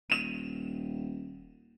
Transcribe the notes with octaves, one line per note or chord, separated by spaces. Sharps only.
D#1 D#7 E7